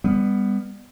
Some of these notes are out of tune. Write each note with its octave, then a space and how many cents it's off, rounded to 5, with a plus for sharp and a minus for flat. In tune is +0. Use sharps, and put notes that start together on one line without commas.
G3 +35 B3 +10